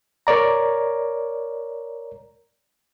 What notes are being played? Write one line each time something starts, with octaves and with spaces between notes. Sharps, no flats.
A#4 C#5 D5 A#5